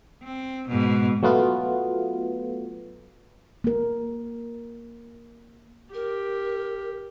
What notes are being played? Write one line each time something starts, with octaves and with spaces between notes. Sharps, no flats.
C4
G#2 B2
F#3 A3 B3 F4
A#3 A#4
G4 A#4